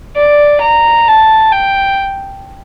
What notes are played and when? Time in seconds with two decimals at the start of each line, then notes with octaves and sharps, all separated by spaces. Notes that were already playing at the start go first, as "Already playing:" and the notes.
0.16 D5
0.61 A#5
1.08 A5
1.52 G5